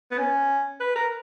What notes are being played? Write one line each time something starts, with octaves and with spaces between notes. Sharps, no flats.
B3
C#4
B4
A#4